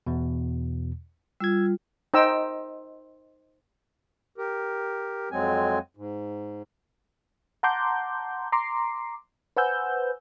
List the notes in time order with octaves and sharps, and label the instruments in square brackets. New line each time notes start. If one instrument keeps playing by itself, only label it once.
[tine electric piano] E2 B2
[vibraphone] G3 F4 [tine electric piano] E6 G#6
[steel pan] D#4 C5 D#5 G5 E6
[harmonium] G4 A#4
F2 F#3 G#3 C4 G#5
G#2
[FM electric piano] F#5 A5 A#5 C6 D6 G6
A#5 C6 D6 C7
B4 C5 F#5 G#5 E6 G6